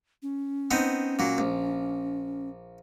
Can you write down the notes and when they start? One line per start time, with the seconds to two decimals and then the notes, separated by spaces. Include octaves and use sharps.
0.22 C#4
0.71 B3 C4 D#4
1.19 A#2 F#3
1.38 A#1